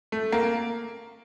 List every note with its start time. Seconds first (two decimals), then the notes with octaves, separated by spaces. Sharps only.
0.12 A3
0.33 A#3